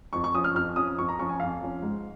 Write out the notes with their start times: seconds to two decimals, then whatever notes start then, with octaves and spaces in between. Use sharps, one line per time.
0.13 F2 C#6
0.24 C#6
0.35 F3 C#4 D#6
0.44 F6
0.55 F2 F6
0.76 F3 C#4 D#6
0.98 F2 C#6
1.09 A#5
1.19 F3 C#4 C#6
1.29 G#5
1.40 F2 F5
1.61 F3 C#4
1.82 G#2